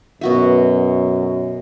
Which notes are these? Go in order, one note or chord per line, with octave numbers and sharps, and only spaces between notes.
F#2 B2 F#4 E5